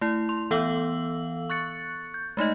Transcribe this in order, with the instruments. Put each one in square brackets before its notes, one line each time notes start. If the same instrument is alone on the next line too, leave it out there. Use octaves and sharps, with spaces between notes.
[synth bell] A3 E4
C6
E3 B3 A4 F5 E6 F#7
C#6 F#6 A6 C#7
G6
G#3 A3 D#4 D#5